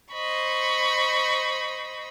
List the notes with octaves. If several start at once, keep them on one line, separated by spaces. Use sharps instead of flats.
C5 D#5 B5 C#6